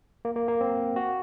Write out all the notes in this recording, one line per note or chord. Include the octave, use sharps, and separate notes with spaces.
A#3
A#3
A#3
C4
F#4